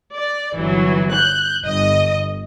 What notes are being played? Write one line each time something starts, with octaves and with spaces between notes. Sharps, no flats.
D5
G1 E3 F#3
F#6 G6
G1 D#5